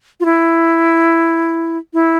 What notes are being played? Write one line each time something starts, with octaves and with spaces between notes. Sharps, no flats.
F4
E4
E4